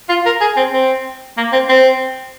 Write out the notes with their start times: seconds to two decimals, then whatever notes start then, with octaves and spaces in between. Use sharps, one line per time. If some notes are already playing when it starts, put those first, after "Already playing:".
0.09 F4
0.26 A#4
0.41 G#4
0.57 C4
0.73 C4
1.37 A#3
1.52 C4
1.69 C4